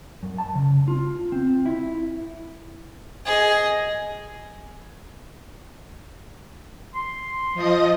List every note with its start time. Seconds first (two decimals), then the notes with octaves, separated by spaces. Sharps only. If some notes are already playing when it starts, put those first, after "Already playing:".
0.23 F#2
0.38 A5
0.55 C#3
0.88 F4
1.32 C4
1.66 E4
3.26 G#4 D#5
6.95 C6
7.54 F3 D#5 D#6